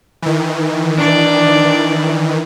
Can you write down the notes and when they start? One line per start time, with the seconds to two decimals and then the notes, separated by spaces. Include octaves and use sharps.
0.22 D#3 E3
0.97 D4 D5